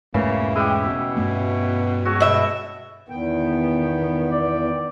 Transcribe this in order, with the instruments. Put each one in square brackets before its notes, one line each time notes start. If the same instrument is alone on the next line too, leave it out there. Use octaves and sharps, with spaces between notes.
[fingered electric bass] E1 G#2 A3 [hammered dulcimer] C#3 E3 [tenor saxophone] A#3
[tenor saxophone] G#3 [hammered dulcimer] E4 G4
[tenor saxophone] B2
[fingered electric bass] G2 A3 B3
[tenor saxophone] G#3 [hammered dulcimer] F#4 A4 C#5
[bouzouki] B2 E5
[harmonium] E2 G5 [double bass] D#3 B3
[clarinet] D5